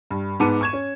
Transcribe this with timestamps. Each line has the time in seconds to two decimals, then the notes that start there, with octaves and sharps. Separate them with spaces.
0.11 G2
0.40 G#2 B3 A5 D6 C#7 D#7
0.61 C#6 G#6 E7
0.73 C#4